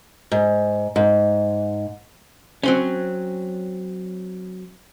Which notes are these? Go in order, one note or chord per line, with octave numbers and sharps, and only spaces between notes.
G#2
G#2
F#3 C4 C#4